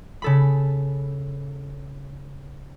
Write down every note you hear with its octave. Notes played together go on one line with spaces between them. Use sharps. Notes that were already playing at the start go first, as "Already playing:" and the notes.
C#3 A4 B5